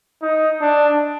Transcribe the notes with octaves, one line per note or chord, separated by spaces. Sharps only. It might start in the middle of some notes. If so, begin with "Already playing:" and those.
D#4
D4